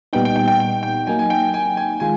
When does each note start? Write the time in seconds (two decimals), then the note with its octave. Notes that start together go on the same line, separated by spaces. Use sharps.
0.13 A#2 G3 B3 D#4 G5
0.25 G5
0.36 G5
0.48 G5
0.60 G5
0.83 G5
1.07 F#3 A#3 D#4 G#5
1.19 G#5
1.30 G5
1.54 G#5
1.77 G#5
2.00 D#3 G#3 F4 G#5